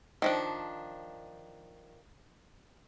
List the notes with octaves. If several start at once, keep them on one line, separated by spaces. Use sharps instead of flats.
D#3 F3 D4